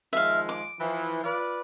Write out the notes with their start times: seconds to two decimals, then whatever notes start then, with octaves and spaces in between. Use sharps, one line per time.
0.13 D#3 F3 G#3 E5 F5
0.49 D6
0.79 E3 F3
1.24 F4 B4 D5